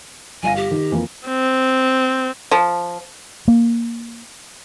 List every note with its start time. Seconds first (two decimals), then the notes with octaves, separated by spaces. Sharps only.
0.43 G1 F5 G#5 A#6
0.56 G4
0.71 D#3
0.91 F2 E3 A#3
1.27 C4
2.51 F3
3.48 A#3